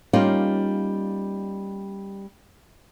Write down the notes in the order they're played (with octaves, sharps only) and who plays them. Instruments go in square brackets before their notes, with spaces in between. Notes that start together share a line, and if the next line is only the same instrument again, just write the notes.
[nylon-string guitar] G3 A#3 C#4 D#4 F4